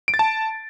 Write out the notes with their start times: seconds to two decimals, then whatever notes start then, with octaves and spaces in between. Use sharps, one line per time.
0.08 D7
0.14 A6
0.19 A5